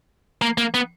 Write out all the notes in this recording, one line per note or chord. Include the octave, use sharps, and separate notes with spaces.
A#3
A#3
B3